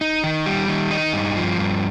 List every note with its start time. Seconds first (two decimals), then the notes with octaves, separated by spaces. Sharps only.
0.01 D#4
0.24 D#3
0.46 G3
0.68 D#3
0.91 D#4
1.13 G2
1.36 F3
1.58 G2